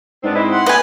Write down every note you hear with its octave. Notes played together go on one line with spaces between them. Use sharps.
G#2 B3 C4 D4
C4 E4 D#5
F#5 C6
B4 D#5 G#5